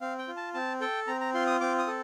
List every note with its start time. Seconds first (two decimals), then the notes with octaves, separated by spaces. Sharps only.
0.01 C4 F5
0.19 G5
0.28 F4
0.37 A5
0.54 C4 A5
0.81 A4 G5
1.07 C4 A#5
1.21 A#5
1.34 F4 C6
1.47 D#6
1.61 C4 D6
1.78 D#6
1.87 A4